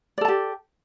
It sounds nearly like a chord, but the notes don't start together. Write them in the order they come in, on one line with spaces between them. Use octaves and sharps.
D5 A4 A5 G4